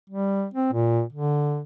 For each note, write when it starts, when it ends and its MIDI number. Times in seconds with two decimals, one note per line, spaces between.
0.09 0.46 55
0.54 0.71 60
0.72 1.02 46
1.13 1.62 50